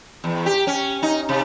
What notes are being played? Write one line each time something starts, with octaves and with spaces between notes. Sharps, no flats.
E2
G4
C#4
D#4
C3